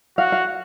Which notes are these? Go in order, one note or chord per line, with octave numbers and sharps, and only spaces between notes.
F#4 F5
F5